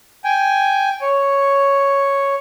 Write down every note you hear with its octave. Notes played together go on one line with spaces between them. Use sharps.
G5 G#5
C#5